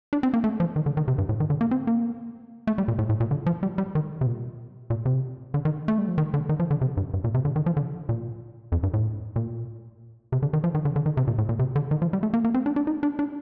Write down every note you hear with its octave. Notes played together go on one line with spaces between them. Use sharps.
D4
C4
A#3
A3
F3
D#3
D3
D#3
C3
G2
A2
D#3
D3
A#3
C4
A#3
A3
G3
A#2
A2
A2
A#2
D3
F3
G3
G3
D#3
C3
A#2
A#2
C3
D3
D#3
A3
G3
F3
D#3
D3
D#3
F3
D3
C3
G2
G2
A#2
C3
D3
D#3
F3
D3
A#2
F2
G2
A2
A#2
C3
D3
D#3
F3
D#3
D3
D3
D#3
C3
A#2
A2
A#2
C3
D3
D#3
F3
G3
A3
A#3
A#3
C4
D4
D4
D#4
D4
D4